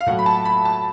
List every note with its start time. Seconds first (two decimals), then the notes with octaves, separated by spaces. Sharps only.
0.01 F5
0.06 A2 F#3 A3 F#5
0.19 B5
0.26 A5
0.45 B5
0.65 A5